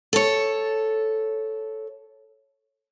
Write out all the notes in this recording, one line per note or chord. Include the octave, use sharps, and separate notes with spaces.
A4 C#5